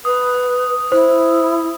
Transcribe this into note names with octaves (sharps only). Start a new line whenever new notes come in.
B4 D#6
E4 C5